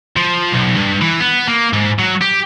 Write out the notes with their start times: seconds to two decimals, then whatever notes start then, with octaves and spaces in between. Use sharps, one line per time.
0.17 F3
0.52 B1
0.77 G2
1.02 E3
1.20 B3
1.47 A#3
1.73 G#2
1.99 F#3
2.21 G4